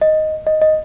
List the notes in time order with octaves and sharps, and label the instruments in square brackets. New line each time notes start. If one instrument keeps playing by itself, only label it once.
[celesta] D#5
D#5
D#5